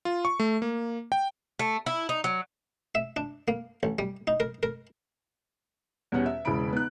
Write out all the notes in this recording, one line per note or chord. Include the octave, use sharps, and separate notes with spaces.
F4
C#6
A3
A#3
G5
A3
E4
D#4
F#3
E5
D4
A#3
A1
G3
D#4
A#4
A#4
E2 B2 G3 C#4 F#5
E5
E1 C#3 G#3 E4 B5 D7
B3 D#4 F#6